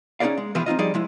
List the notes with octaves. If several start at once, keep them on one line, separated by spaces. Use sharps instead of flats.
C#4 D#4 F4 G#4 D5 F5
G#3
B2 E3 F3 E4 F4 G#4
C4 D#4 F4 D#5
F3 G3 D#4 G#4 D5 D#5
F3 G#3 E4